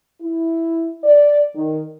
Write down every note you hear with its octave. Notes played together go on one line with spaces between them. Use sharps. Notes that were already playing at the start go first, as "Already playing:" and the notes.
E4
D5
D#3